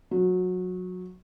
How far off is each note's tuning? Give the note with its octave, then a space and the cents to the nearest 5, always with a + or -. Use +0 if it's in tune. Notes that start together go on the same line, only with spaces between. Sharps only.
F#3 -20